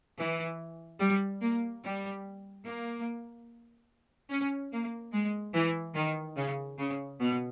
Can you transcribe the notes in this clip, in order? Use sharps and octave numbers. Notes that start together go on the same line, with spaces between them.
E3
G3
A#3
G3
A#3
C#4
A#3
G#3
E3
D#3
C#3
C#3
B2